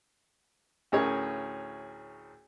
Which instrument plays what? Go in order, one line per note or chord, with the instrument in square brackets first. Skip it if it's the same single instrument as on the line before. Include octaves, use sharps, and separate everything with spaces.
[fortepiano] D2 A2 C#4 G#4 A#4 C#5